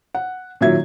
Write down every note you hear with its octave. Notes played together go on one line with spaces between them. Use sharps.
F#5
A#2 D#3 F#3 E5 G#6